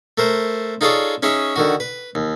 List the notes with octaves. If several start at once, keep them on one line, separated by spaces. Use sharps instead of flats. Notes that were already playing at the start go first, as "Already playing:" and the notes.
A3 A#4 C5
D#4 F4 G#4 A4 C#5 D5
C#4 D#4 G#4 C#5 E5
D3 D#3 F#4
B4
D#2